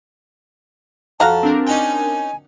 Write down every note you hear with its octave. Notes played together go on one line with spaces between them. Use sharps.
F2 F#4 F5 A5 A#5
C4 D4 A#4
C#4 D#4 G5 G#5